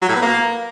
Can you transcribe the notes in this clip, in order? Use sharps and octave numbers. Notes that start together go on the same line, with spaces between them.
F#3
A2
B3
A#3